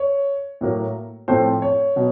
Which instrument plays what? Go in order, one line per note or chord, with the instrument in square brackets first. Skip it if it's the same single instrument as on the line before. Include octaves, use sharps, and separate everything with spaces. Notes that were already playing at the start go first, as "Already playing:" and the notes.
Already playing: [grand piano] C#5
A2 F#3 A#3
A2 F3 A3 C4 C5
C#5
B2 F#3